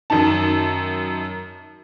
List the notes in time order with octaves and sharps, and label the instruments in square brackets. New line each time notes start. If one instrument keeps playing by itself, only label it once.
[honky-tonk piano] F#2 D#3 D#4 A5